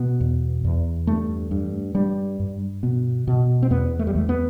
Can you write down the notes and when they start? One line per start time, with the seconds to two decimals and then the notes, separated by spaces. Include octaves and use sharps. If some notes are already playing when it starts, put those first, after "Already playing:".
Already playing: B2 B3
0.20 E2
0.65 E2
1.07 G2 A3
1.51 G2
1.95 G2 G3
2.40 G2
2.83 B2 B3
3.27 B2
3.63 C4
3.70 E2 B3
3.99 A3
4.07 G3
4.15 E2 A3
4.29 B3